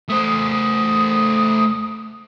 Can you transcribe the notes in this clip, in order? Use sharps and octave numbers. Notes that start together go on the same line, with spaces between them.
A3 C5 D#6